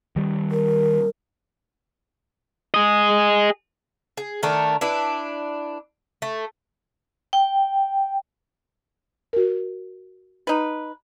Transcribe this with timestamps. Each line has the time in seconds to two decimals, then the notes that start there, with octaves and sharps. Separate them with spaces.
0.16 D#3 G3
0.51 A#4
2.74 G#4 D#5
4.17 G#4
4.43 D#3 A3 D4 A#4
4.81 D4 E4 B4
6.22 A3
7.33 G5
9.33 F#4 A#4
10.47 D#4 B4